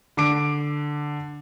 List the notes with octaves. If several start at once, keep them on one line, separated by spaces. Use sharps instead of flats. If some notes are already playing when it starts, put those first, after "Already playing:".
D3 D6 D7